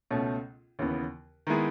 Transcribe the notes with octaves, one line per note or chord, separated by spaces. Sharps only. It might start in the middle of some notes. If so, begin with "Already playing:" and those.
C#2 B2 A3 C#4
D#2 C#3 E3 B3
D#3 G#3 B3 E4 G#4